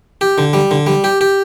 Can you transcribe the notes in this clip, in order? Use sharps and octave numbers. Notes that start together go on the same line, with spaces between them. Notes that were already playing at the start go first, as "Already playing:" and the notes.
G4
D3
G3
D3
G3
G4
G4